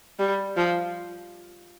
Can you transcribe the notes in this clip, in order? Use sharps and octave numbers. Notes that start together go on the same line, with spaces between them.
G3
F3